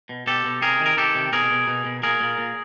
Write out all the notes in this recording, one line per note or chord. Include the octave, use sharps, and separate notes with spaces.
B2
B2 G4 A4
B2
C3 G#4 A#4
D#3
A#4
D#3 G4 A4
C3
B2 G#4 A#4
B2
B2
B2
A#2 G#4 A#4
A#2
A#2